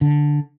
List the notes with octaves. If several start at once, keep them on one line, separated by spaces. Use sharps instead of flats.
D3